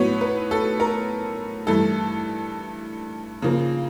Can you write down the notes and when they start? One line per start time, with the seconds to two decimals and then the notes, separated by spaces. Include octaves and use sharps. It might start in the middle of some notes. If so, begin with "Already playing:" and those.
Already playing: A2 F#3 B3 C#5
0.21 B4
0.51 A4
0.80 A#4
1.67 G2 E3 A3 A4
3.42 C#3 F3 A#3